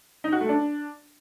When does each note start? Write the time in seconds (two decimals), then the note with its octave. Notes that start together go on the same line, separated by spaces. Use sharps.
0.24 D#4
0.32 F#4
0.41 A3
0.49 D4